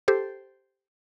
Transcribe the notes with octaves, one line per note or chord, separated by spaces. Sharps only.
G4 A4 C5